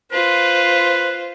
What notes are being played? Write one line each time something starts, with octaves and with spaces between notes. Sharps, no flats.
F4 B4 C5